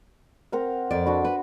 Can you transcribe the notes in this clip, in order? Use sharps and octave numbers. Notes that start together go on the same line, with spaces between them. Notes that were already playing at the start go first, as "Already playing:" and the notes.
C4 A#4 F#5
F2 D5
D4 F#4 B5
B4